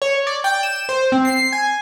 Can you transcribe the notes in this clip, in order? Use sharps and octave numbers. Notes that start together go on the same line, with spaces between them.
C#5
D5
G5
E7
C5
C4
C7
G#5